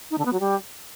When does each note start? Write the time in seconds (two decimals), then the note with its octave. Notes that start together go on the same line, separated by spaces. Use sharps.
0.11 D#4
0.18 D3
0.25 B3
0.33 F#3
0.40 G3